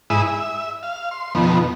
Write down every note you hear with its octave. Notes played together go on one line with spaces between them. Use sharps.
G#2 E4 G#4 B5 D#6 E6
E5
F5
C6
F2 B2 D#3 F3 B3